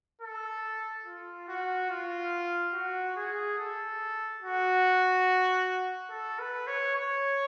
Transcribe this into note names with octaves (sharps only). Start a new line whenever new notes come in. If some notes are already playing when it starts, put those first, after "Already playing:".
A4
F4
F#4
F4
F#4
G#4
A4
F#4
A4
B4
C#5
C#5